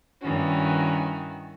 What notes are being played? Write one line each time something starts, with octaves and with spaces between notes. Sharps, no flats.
G2 D#3 E3 C#4 F#4